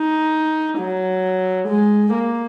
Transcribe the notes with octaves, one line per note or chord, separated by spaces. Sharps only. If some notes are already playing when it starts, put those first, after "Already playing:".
Already playing: D#4
F#3
G#3
A#3